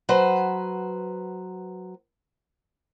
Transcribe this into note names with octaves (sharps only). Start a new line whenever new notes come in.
F#3 B4 C5